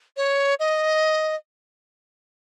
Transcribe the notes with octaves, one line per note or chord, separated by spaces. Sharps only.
C#5
D#5